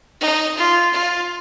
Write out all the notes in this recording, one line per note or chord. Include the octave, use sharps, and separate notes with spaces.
D#4
F4
F4